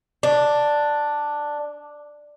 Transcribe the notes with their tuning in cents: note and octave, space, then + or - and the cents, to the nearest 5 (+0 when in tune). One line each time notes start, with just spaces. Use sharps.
D4 +5